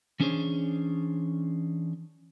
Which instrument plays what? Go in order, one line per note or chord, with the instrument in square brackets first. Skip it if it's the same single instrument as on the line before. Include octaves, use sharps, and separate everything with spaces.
[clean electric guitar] E3 C#4 D4 G#4 C5 C#5